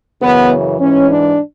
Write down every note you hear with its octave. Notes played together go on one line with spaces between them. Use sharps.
F#2 C#3 E3 B3
G#2 E3 C#4
D4